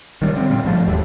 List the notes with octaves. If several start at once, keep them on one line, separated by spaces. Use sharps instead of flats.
D#3 G3
D3 C4
A#2 G3 A#3 C4
G#2 F3 A3
E1 D#2 G3 A3